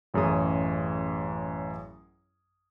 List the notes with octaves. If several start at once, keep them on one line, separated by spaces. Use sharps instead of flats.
A1 F#2 G#4 D#6